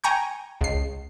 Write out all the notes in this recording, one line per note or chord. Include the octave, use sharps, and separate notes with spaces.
G5 G#5 A#5 C#6 G6
C#2 C7